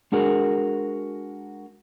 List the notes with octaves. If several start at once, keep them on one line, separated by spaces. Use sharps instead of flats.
G#3 D4 F#4 G#4 A#4